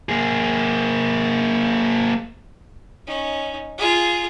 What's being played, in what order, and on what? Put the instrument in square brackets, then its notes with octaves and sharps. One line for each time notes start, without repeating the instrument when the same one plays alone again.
[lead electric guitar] A#3 G#4
[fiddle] C#4 D#4
F4 G#4